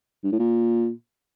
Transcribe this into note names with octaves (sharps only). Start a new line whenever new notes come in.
G2
A2
A#2